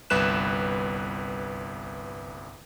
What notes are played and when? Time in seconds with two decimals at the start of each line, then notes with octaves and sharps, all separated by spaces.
0.10 G1 C2 B4 F#6 E7